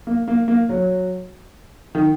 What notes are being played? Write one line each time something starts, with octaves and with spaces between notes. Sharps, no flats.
A#3
A#3
A#3
F#3
D#3